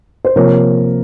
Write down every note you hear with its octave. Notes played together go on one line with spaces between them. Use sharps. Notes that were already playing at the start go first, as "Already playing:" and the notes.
C5
C3 F3 A#3 A#4 C#5